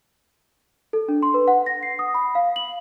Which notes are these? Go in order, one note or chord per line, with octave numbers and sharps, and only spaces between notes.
A4
D4
C6
B4
F#5
A#6
C7
D#6
B5
F5
F#7